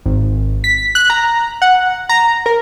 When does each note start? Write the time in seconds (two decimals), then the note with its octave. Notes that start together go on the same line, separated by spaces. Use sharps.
0.06 G#1
0.64 B6
0.95 F#6
1.10 A#5
1.62 F#5
2.09 A#5
2.46 A#4